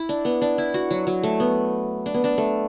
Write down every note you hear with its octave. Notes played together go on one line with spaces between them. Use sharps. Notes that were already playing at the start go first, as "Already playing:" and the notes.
Already playing: E4
D4
B3
D4
E4
F#4
F#3
F#3
A3
B3
D4
B3
D4
A3